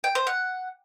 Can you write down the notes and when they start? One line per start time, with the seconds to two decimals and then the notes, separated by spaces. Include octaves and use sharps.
0.04 G5
0.15 C5
0.27 F#5